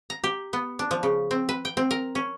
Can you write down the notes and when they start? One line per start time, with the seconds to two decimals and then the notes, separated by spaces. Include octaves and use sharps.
0.10 A#5
0.24 G4
0.53 B3
0.79 D4
0.91 F3
1.03 C#3
1.31 C4
1.49 B4
1.65 G5
1.77 C4
1.91 A#4
2.15 C#4